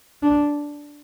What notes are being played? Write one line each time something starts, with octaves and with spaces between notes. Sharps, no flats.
D4